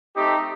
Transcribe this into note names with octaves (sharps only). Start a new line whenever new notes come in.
A3 C4 D#4 G4